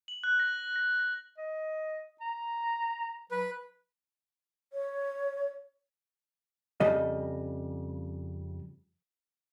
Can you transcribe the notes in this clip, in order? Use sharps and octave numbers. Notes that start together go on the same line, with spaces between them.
F#7
F#6
A#6
A#6
A#6
D#5
A#5
F#3 B4
C#5
F2 C#3 G3 D#5